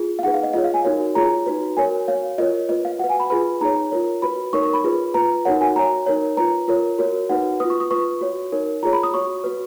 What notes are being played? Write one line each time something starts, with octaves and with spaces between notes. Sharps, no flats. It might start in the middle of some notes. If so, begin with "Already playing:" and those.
Already playing: F4 G#4
F5
D#4 G#4 B4 F#5
F5
D#5
F4 G#4 C#5 D#5
F5
G#5
D#4 F#4 A#4 C#5
F4 G#4 C#5 A#5
D#4 F#4 B4
F#4 A#4 C#5 G#5
F#4 C#5 F5
F4 A#4 C#5 D#5
F4 B4 D#5
F5
F#4 B4 F#5
G#5
B5
F4 G#4 B4 B5
D#4 G#4 C#5 A#5
F4 A#4 C#5
F#4 B4 B5
D#4 A#4 C#5 C#6
C#6
B5
F4 G#4 B4
F4 B4 A#5
D#4 F#4 A#4 C#5 F#5
G#5
F#4 C#5 A#5
D#4 A#4 C#5
F4 B4 A#5
F4 A#4 C#5
F#4 A#4 C#5
D#4 F#4 B4 F#5
F4 B4 D#6
C#6
D#6
F4 B4 C#6
F#4 C#5
D#4 A#4 C#5
F4 G#4 C#5 A#5
B5
D#6
F#4 C#5 C#6
F#4 B4